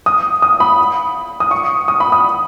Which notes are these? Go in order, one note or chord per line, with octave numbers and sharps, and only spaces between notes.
D#6
D#6
B5
D#6
C#6
D#6
B5
D#6